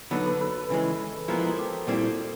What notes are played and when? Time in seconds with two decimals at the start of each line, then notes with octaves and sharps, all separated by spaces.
0.11 D3 F#3 B3 D#4 A4 B4
0.25 A4 B4
0.40 A4 B4
0.70 C#3 E3 G#3
1.28 F3 G#3 B3 E4 A#4 C5
1.43 G#4 A#4
1.58 G4 A4
1.68 F#4 G#4 A4
1.87 A#2 G3 C4 E4 G4 A4